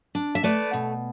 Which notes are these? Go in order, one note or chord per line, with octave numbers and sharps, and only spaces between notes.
D4
E5
A3 B4 D5
B2